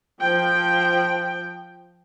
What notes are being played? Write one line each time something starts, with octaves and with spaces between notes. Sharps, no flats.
F3 G5